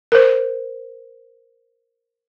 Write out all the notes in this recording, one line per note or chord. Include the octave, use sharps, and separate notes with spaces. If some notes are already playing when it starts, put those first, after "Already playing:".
A#4 C5